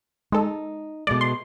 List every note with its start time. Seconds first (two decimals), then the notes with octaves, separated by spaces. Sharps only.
0.32 G#3 D#4 A4
1.07 B2 G#3 A3 D5
1.21 C6